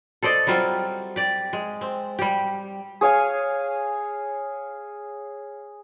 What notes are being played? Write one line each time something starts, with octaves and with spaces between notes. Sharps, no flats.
A4 C5 D5 D#5
F#3 G3 C4 F4
G4 D5
G#3
C4
G3 G4
G#4 C#5 F5 G#5